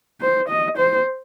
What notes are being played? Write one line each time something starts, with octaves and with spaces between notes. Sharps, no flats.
C5
D#5
C5